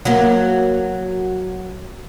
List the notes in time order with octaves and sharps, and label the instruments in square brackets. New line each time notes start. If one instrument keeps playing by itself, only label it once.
[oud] F#3 A#3